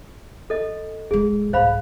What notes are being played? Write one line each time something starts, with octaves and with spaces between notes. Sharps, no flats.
A4 D#5
D1 G#3 G#4
C2 G#2 C5 F5 B5